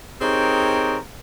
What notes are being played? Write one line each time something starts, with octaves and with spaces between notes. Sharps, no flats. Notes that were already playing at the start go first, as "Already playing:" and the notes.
C4 D#4 G4 G#4 A#4 C#5